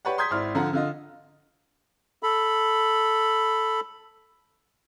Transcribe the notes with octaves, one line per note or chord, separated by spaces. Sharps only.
G4 B4 C#5 D5 F#5
A#5 C6 D#6 G6 G#6 B6
G#1 E4 D5 C6 F6
D3 F3 F4 F5 F#5 A#5
D3 F4 D#5
A4 B5